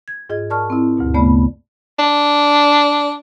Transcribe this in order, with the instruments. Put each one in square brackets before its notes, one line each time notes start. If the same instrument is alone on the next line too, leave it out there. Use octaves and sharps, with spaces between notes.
[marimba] G#6
G#2 F4 G#4 D#5 G#6
A#4 D5 A5 C#6 F6
C4 E4
D2 G2 B2
C#3 A3 B3 D5 B5
[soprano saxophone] D4